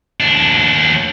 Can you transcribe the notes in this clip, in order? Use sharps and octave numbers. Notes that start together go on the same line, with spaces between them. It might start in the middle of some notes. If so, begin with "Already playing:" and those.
D#2 D4